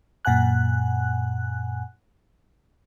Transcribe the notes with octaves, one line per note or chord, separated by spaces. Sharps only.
F#2 A#2 F#5 G#5 F#6